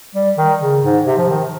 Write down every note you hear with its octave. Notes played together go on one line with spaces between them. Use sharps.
G3
D#3
C#3
G#2
C3
F3
D#3